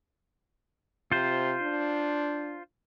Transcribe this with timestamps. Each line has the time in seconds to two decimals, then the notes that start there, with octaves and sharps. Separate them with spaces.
1.12 C3 F4 C5
1.62 D4